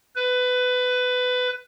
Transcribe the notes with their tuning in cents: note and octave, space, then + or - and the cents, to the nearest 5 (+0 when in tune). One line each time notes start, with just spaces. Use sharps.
B4 +20